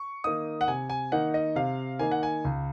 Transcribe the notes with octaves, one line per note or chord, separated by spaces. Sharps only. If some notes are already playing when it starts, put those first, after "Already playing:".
Already playing: C#6
D#3 A#3 D#4 D#6
F#5
C3 G#5
G#5
D#3 A#3 D#4 F#5
D#5
C3 F5
D#3 A#3 D#4 G#5
F#5
G#5
C#2